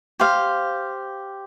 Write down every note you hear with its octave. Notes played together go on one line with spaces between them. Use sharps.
G4 C5 F5